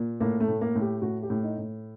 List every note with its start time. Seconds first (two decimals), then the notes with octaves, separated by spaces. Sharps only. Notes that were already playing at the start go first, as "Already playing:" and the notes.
Already playing: A#2
0.20 A2 A#3
0.40 A3
0.48 A2
0.61 A#3
0.75 A2
0.81 G4
1.02 A2 F#4
1.23 G4
1.30 A2
1.43 D#4
1.58 A2